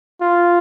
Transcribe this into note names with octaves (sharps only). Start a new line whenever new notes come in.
F4